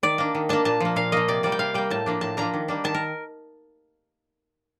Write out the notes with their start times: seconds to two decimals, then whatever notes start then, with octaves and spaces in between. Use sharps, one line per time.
0.03 D#3 D5
0.18 A#3 D4
0.35 D#3
0.49 A#3 D4 A5
0.65 A#2 A5
0.80 F3 A#3
0.96 A#2 F5
1.12 F3 A#3 D#5
1.28 C3 D5
1.43 G3 A#3 D5
1.52 G5
1.59 C3 F5
1.74 G3 A#3 G5
1.90 A2 A5
2.06 F3 A#3 D4
2.21 A2 A5
2.37 F3 A#3 D4 A#5
2.54 D#3
2.68 G3 A#3 D4
2.84 D#3 A5
2.94 A#4